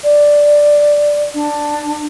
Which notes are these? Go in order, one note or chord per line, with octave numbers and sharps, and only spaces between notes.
D5
D4